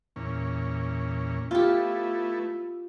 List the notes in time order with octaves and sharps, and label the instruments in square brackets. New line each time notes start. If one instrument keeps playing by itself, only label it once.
[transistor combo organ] E2 A#2 C#4
[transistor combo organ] A3 B3 E4 [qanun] F4 G4